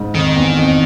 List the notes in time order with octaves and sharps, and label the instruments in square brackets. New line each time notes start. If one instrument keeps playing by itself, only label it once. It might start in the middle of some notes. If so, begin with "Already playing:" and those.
Already playing: [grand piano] G#2 C#3
[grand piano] F2 [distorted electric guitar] D#3
[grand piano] E2
F2